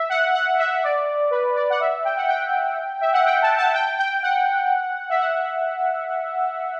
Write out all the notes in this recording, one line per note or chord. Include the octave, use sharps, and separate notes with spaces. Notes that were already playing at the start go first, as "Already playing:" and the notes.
Already playing: E5
F#5
F#5
E5
D5
B4
D5
F#5
E5
G5
F#5
G5
E5
F#5
G5
A5
A5
G5
G5
F#5
E5
F#5